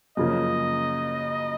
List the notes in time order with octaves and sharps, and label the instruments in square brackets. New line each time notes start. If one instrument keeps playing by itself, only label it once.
[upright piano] F#2 C#3 F3 A#3 [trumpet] D#5